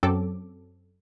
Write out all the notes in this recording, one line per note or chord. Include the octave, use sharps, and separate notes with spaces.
F#2 F#3 C4 A4 D6